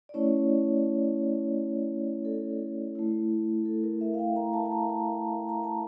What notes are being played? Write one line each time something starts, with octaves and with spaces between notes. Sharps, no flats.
D5
A3 C#4 E4 C#5
A4
A3 E4
A4
A#4
E5
F5
G5
A#5
A5
A5
A#5
A5
A#5
A5